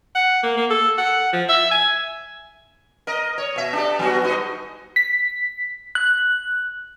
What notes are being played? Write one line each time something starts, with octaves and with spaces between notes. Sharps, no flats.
F#5
A#3
A#3
A4
F#5
F3
E5
G#5
A#4 D#5
C#5
B2 E5
D4 G4 A4
F#3 B3 F#4
G2 D#4 D#5
B6
F#6